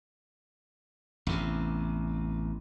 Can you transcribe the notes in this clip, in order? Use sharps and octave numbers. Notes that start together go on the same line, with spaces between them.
A1 E2 C3